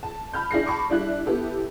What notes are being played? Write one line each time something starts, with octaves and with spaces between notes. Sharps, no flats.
A5
A5 B5 F6 G6
D4 E4 G#4 A#6 C7
A5 B5 C#6 D6
G3 D4 E4 F#6
B3 E4 G4 A4